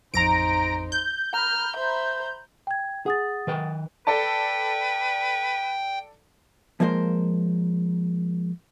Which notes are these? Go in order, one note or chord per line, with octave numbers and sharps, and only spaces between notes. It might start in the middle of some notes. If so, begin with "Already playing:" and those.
A1 F2 D#4 C5 A#5 A#6 D7
G6
A#5 B5 F6
C5 E5
G5 G#6
G#4 F#5 D#6 A6
D#3 B4 G5
A4 B4 D5 G5 A5
F3 G#3 A#3 A#4 C5